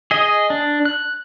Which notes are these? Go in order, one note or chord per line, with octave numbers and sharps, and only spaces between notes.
G#4 D#5
D4
F#6